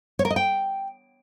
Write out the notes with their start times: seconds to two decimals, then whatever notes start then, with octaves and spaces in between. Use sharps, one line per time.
0.19 C#5
0.25 A#4
0.30 D#5
0.36 G5